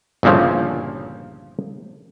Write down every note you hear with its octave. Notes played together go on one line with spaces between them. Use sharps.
G1 C2 A#2 C#3 F3